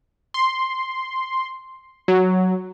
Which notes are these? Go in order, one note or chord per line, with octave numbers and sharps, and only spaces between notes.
C6
F#3